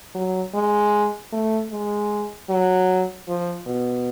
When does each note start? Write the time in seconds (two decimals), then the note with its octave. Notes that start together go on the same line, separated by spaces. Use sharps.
0.15 F#3
0.54 G#3
1.33 A3
1.71 G#3
2.50 F#3
3.28 F3
3.67 B2